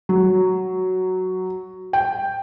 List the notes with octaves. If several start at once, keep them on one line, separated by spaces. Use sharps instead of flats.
F#3
G5